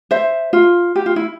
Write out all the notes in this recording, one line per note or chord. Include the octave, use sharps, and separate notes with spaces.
C5 E5
F4
G4
F4
E4